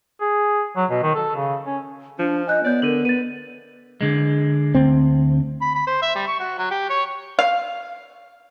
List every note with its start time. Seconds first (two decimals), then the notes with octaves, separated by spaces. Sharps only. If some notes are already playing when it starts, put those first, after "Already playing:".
0.21 G#4
0.77 F#3
0.90 B2
1.03 D#3
1.15 A4
1.36 C#3
1.67 C#4
2.19 F3 D4
2.47 D#5 G#5 F#6 G6
2.64 B3 C#5 D5 G6
2.82 D3 A#4 D#7 F#7
3.05 B4 A6 D#7
4.01 D3 G#3
4.75 D2 C4
5.62 B5
5.75 B5
5.87 C5
6.02 E5
6.15 G3
6.28 C#6
6.40 F#4
6.58 F#3
6.71 G4
6.90 C#5
7.39 F5